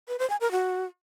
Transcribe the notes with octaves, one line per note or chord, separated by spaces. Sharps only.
B4
C5
G#5
A#4
F#4